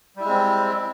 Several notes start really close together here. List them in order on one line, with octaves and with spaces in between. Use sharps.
G3 E4 G#3 C4